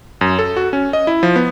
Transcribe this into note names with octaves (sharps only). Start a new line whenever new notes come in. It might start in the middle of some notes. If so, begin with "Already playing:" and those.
F#2
A4
F#4
C#4
D#5
E4
F3
B3